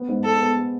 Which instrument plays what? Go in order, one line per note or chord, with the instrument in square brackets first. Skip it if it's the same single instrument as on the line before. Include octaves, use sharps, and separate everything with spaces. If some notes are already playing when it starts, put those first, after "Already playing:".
Already playing: [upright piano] B3
G#2
[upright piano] G#3 [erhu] A4
[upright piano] B3
G#3